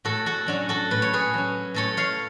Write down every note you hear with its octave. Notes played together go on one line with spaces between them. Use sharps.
A2 F#4 A4
F#4 A4
F#3 C#4 D4 F#4
F#4 A4
A2 B4
C#5
G#4 B4
F#3 C#4
A2 A4 C#5
C#5 F5